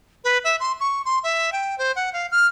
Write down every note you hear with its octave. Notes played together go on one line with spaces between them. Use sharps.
B4
E5
C6
C#6
C6
E5
G5
C5
F#5
F5
F6